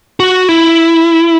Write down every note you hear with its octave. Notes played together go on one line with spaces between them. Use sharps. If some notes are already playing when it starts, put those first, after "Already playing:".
F#4
E4